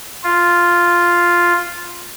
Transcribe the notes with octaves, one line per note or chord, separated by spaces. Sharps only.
F4